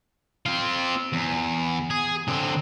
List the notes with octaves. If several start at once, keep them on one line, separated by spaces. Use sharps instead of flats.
C4 F4
E2
G#4
D3 C4